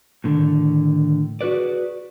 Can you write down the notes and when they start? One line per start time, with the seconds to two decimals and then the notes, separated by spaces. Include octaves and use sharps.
0.24 A2 D3 D#3
1.41 F#4 G#4 B4 D5